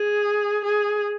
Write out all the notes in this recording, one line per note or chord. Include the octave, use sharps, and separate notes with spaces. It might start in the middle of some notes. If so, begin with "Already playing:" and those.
Already playing: G#4
G#4